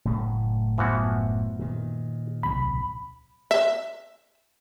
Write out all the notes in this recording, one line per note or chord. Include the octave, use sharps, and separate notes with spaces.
F#1 A2 A3
F#2 E3 F3 B3 F#4
A#2 D#3
D1 B1 C3 B5
E5